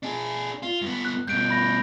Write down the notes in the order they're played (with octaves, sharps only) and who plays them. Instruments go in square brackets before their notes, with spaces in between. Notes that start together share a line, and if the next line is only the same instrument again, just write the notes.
[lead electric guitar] D4 G#4
F4
G2 B3
[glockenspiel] F#6
[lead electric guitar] G2 B2 [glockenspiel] G6 D7
[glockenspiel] B5 A#6